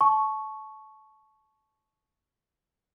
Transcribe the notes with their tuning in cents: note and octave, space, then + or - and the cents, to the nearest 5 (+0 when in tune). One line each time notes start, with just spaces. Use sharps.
A5 -25 C#6 +0